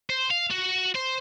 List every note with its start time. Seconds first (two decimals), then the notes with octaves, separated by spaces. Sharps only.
0.10 C5
0.31 F5
0.50 F#4
0.95 C5